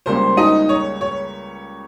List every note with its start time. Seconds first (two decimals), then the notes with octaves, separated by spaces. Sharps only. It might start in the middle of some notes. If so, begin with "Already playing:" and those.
0.06 C#2 C#3 G3 A#3 C5 C6
0.37 D#4 D#5
0.69 C#5
1.01 C#5